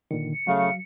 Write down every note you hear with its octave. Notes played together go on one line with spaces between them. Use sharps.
A#2 D3 D#3 C#7
C#3 F#3 A3 F5